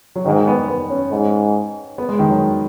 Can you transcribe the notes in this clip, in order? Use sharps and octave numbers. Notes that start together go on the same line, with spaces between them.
F#3
G#2 D#3
B3
B3
C#4
G#2
B3
G#3
D#3
F#3